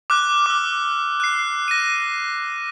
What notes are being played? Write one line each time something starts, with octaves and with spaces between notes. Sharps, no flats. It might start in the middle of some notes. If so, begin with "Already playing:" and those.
D6 F6 F#6
D6 E6
F#6 C7
A#6 D#7